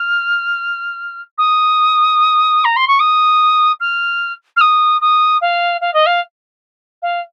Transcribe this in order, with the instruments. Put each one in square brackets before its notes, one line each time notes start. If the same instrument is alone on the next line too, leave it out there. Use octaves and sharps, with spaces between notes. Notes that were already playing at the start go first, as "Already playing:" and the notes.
Already playing: [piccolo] F6
D#6
A#5
C6
C#6
D#6
F6
F6
D#6
D#6
F5
F5
D#5
F5
F5